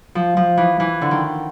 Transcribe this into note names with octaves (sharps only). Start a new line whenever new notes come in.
F3
F3
E3
E3
D3
D#3